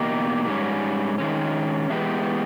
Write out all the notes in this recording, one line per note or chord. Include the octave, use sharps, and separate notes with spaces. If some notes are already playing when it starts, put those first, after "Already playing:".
Already playing: E2 B2 A#3 D#4 G4
G#2 G3 C#4
D#3 G#3 C#4
E3 G#3 B3 G4